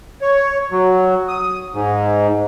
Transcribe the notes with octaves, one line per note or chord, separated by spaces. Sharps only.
C#5
F#3
D#6
G#2